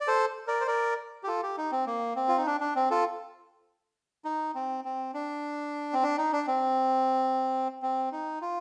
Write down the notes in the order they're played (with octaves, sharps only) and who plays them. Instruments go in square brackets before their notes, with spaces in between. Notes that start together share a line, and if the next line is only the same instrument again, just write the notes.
[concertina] D5
A4 C5
A#4 D5
C5
A#4 D5
G4
F4 A4
G4
D#4
C4
A#3
C4
F4
D#4
D4
D4
C4
F4 A4
D#4
C4
C4
D4
C4
D4
D#4
D4
C4
C4
D#4
F4